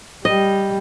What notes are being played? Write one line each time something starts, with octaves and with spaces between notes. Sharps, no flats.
G3 D#5